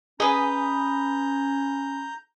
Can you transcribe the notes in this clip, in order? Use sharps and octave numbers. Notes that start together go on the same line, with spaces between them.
C#4 G#4 B4 D#5 A#5 G6